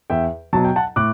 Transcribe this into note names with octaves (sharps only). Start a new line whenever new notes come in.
E2 E5 G5
B2 F#3 A5
G5
F#5 A5
A2 D6 F#6